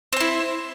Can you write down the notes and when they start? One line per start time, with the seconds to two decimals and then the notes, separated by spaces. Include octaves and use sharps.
0.13 C4
0.16 C5
0.20 E4